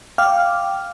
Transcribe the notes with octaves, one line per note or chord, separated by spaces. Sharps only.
F5 G5 D6 F6